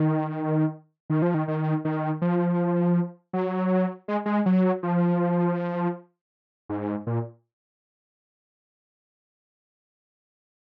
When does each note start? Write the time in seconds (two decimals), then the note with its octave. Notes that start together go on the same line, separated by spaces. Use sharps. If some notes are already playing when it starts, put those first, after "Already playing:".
Already playing: D#3
1.10 D#3
1.22 F3
1.34 D#3
1.48 D#3
1.85 D#3
2.22 F3
3.33 F#3
4.08 G#3
4.26 G#3
4.46 F#3
4.83 F3
6.69 G#2
7.07 A#2